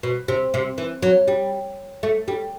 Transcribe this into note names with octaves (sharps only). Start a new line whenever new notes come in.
B2
C3
C3
E3
F#3
G3
A3
G3